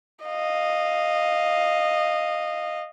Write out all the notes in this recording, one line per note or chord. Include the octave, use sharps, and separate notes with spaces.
D#5 F5